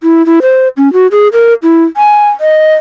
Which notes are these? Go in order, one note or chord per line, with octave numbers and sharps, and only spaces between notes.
E4
E4
C5
C#4
F#4
G#4
A#4
E4
G#5
D#5